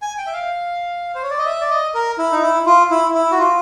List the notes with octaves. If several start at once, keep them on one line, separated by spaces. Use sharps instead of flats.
G#5
G5
E5
F5
C5
C#5
D5
D#5
E5
D5
D#5
A#4
E4
D#4
E4
F4
E4
E4
F#4
F4